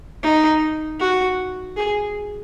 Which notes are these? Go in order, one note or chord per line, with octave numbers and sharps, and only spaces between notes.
D#4
F#4
G#4